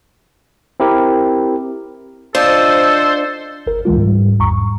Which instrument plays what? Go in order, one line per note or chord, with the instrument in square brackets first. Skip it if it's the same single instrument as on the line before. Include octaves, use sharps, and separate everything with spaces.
[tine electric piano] C4 E4 G4 A#4
[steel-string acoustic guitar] D4 F4 D#5 [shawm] A4 [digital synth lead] C5
[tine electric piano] G1 A#4
C#2 E3 G#3 F4
G#2 G3
G#1 E2 A#5 C#6
G#2